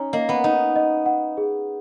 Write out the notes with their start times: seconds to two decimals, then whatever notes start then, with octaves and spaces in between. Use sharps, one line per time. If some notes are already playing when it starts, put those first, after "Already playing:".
Already playing: C#4 D#4 A#5
0.13 A#3 D#5
0.29 B3
0.44 D#4 D#5
0.76 D#5
1.06 F#5
1.37 G#4